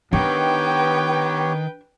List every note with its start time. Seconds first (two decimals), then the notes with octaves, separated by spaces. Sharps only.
0.13 D#3 B3 D4 G4 B4 C#5 G5